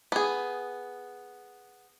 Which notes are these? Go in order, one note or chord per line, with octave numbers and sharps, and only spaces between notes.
B3 G#4